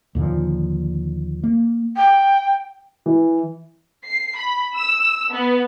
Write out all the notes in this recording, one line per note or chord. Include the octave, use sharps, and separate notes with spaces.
D#2 A#2 D3 F3
A#3
G5
E3
C7
B5
E6
B3